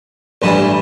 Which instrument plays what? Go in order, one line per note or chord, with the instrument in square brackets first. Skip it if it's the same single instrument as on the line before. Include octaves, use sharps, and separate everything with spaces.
[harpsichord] A1 G2 E3 G3